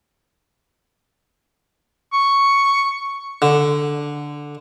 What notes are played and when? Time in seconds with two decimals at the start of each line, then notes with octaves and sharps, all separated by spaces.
2.13 C#6
3.42 D3